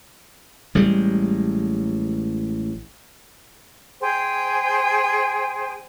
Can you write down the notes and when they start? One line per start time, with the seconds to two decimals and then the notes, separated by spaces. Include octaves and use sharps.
0.75 A1 G3 G#3
4.01 G#4 C5 G5 G#5